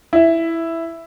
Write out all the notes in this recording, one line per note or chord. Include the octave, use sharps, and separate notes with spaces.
E4 E5